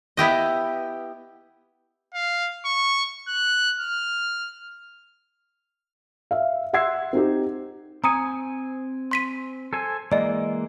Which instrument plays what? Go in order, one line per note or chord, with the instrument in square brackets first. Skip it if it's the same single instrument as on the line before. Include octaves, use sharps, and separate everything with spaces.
[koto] B3 E4 G4 D#5
[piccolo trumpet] F5
C#6
F#6
F6
[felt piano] E5 F5
E5 F#5 C6 E6 G#6 C7
C4 D#4 G4
[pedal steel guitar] C4 G#5 [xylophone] A#5 D#6 C#7
[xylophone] C6 B6 D#7
[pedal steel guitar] A4 C5 G#5
[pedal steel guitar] E3 G#3 A#3 [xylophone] D5 D#5